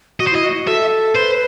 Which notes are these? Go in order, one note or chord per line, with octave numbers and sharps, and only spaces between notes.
F#4 D#5
C5
E4 D#5
F#4
A4 E5
B4 C5